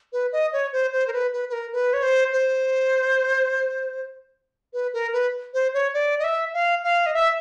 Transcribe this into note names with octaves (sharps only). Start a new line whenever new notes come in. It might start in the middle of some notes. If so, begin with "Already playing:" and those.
B4
D#5
C#5
C5
C5
A#4
B4
B4
B4
A#4
B4
C#5
C5
C5
B4
A#4
B4
C5
C#5
D5
D#5
E5
F5
F5
D#5
E5